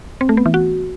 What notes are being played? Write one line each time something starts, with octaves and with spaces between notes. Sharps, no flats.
C4
A3
B3
E3
F#4